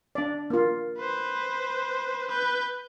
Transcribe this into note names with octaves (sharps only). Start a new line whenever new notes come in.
D4 D5
A#3 F4
B4 C5
B4 G6